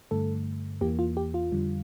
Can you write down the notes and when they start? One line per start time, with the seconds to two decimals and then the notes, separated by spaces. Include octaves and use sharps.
0.11 G2 D3 A3 A4
0.81 E2 E3 A#3 G4
0.99 F4
1.17 G4
1.34 F4
1.52 F2 D3 G3